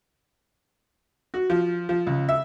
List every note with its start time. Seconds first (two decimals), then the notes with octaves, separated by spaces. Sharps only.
1.34 F#4
1.50 F3
1.89 F3
2.07 C#2
2.29 E5